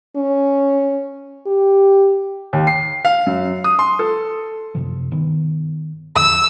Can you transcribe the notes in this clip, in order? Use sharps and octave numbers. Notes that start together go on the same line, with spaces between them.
C#4
G4
D#2
C7
F5
F#2
D#6
C6
A4
F#2 C3 F3
G2 D#3 B3
E2 D3 F3 E6